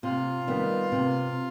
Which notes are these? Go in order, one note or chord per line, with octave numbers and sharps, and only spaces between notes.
C3 F4
D#3 G3 B3
C3